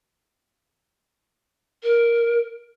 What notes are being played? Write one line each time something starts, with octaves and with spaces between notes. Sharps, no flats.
A#4